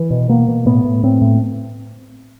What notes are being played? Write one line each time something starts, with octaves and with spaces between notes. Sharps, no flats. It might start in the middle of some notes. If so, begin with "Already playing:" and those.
Already playing: E3
B2
B2 A#3
B2
A2 B3
A2
A2 C4
A2